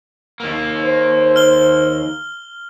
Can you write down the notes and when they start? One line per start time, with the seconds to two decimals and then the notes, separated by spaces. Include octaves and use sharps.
0.40 D#2 A#3
0.83 C5
1.36 F6 G7